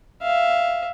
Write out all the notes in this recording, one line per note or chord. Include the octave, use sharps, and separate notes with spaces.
E5 F5